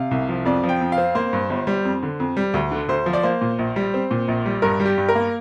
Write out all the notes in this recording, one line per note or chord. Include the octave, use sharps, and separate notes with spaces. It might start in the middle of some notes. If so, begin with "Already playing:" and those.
Already playing: C3 F5
C2
F3
F2 D5
F3
G5
F2
F5
C4
A#3 C5
G2
G1
G3
F2
D3
F2
G3
D2
D3
D2 C5
F3
D5
A#3 C5
A#2
A#1
G3
C4
A#2
A#1
G3
G2 A#4
G3
G4
G2
A#4
A#3